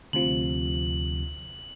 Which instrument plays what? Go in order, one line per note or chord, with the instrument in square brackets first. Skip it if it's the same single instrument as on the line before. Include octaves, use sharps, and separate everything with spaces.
[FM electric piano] D2 C3 F3 [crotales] F#7